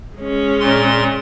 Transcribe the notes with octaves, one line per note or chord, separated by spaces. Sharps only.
G#3 C#4
A#2 C6